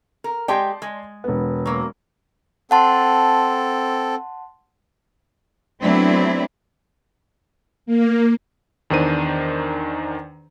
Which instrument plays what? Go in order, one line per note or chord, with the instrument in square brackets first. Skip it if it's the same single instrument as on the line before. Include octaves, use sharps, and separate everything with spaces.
[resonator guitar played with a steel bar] A#4
[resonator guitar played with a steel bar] G#3 G4 G5 [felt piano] D5 A5 C6
[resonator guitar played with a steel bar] G#3
[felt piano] E1 B3
[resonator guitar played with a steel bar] F#3 A#3
[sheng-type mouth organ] C4 A4 [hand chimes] F#5 A5 C6
[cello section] F#3 A3 B3 C4 D4 E4
[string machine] A#3
[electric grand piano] E2 D#3 D4 C5 D#7